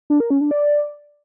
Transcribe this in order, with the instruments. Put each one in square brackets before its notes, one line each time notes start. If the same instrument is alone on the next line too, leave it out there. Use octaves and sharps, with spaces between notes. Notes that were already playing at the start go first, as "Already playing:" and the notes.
[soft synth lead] D4
A#4
C#4
D4
D5